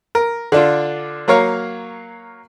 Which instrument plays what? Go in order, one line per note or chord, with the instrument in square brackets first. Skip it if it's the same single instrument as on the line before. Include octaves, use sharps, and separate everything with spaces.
[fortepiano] A#4
D3 D4 F4
F#3 A#3 A#4 C#5 F5